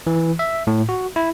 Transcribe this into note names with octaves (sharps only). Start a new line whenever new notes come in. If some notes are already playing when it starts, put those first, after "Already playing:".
E3
E5
A2
F#4
E4